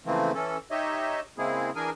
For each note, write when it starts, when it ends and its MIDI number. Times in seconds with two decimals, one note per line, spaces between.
0.06 0.32 49
0.06 0.32 52
0.06 0.32 53
0.06 0.32 57
0.06 0.32 58
0.06 0.32 60
0.35 0.57 52
0.35 0.57 61
0.35 0.57 69
0.71 1.20 63
0.71 1.20 67
0.71 1.20 73
0.71 1.20 75
0.71 1.20 76
1.38 1.70 49
1.38 1.70 56
1.38 1.70 58
1.38 1.70 60
1.38 1.70 64
1.38 1.70 68
1.75 1.90 52
1.75 1.90 62
1.75 1.90 68
1.75 1.90 70
1.75 1.90 80